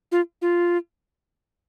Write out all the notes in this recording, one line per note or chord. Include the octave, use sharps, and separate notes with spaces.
F4
F4